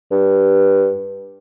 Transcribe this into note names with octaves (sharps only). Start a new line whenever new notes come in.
G2